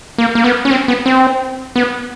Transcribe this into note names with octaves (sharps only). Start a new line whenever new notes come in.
A#3
A#3
B3
C#4
C4
B3
C4
B3